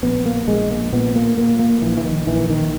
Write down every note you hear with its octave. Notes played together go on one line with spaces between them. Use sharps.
A#1 B3
A#3
A#1 G#3
A#3
A#2 B3
A#3
A#2 A#3
A#3
A#1 E3
E3
D#3
A#1 E3
D#3